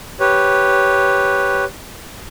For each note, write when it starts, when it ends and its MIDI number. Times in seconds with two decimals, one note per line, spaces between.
0.20 1.65 67
0.20 1.65 71
0.20 1.65 73